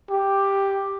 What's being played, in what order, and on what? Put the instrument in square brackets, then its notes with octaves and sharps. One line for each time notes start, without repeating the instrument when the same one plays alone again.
[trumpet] G4